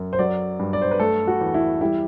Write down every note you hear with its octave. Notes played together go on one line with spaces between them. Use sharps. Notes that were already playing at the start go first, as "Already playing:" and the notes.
Already playing: F#2
C5
F#3 D5
G2
D5
C5
B4
A3 A4
F#4
E2
E4
G3 E4